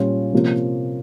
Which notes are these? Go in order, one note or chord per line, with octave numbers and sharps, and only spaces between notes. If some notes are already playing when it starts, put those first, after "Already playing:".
Already playing: A#2 G3 C#4 F4
C3 F3 A#3 C#4 F4